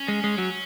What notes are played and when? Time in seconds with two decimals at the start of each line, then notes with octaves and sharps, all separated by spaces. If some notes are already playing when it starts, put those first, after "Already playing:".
Already playing: C#4
0.08 G#3
0.24 G#3
0.38 F#3